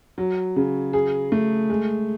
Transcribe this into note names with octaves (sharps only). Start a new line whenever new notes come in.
F#3
C#3
G#4
A3
G#3